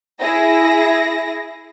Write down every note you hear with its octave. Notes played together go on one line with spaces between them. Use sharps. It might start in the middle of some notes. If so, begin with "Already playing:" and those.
E4 G#4 A#6